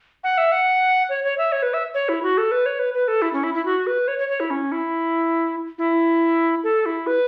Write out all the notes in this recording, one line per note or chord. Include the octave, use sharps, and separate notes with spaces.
F#5
E5
F#5
C#5
C#5
E5
C#5
B4
E5
C#5
E4
F#4
A4
B4
C#5
B4
B4
A4
E4
C#4
E4
E4
F#4
B4
C#5
C#5
C#5
E4
C#4
E4
E4
A4
E4
B4